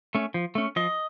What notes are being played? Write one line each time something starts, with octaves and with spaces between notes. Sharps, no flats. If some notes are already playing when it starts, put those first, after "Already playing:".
A3 C#4
F3
A3 C#4
F3 D#5